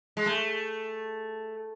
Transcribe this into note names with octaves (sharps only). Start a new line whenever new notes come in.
G#3
A3